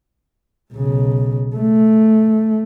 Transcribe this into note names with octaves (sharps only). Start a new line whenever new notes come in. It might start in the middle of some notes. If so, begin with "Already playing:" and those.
B1 C#3
A3